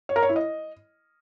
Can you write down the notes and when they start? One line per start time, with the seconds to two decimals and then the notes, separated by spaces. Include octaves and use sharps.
0.09 C#5
0.16 A#4
0.22 C#5
0.29 E4
0.36 D#5